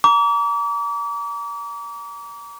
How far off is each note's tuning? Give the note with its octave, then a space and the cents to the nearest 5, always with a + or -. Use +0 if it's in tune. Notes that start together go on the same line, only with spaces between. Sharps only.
A#5 +0 D6 -40